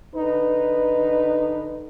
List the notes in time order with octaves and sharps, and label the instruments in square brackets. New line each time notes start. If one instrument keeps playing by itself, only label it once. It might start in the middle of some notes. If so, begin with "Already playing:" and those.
[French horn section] D3 D#4 B4